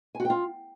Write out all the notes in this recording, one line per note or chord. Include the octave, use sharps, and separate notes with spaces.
G#5
F#4
G5
F4